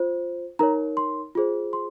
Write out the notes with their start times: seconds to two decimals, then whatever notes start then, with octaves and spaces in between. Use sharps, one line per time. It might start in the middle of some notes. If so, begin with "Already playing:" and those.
Already playing: F4 C5
0.59 D#4 A#4 C#5 A#5
0.97 C6
1.35 F4 G#4 C5
1.73 C6